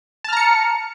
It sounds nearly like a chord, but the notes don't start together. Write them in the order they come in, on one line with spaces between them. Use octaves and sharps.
A5 F6 A#5 C#7